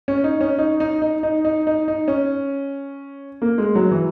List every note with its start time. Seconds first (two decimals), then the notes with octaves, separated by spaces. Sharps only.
0.08 C#4
0.24 D#4
0.41 C#4
0.59 D#4
0.80 D#4
1.02 D#4
1.23 D#4
1.45 D#4
1.67 D#4
1.88 D#4
2.08 C#4
3.42 A#3
3.58 G#3
3.75 F#3
3.91 E3